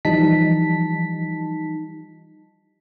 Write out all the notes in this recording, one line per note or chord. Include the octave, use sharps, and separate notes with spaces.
E3 F3 G3 D#4 A5 B6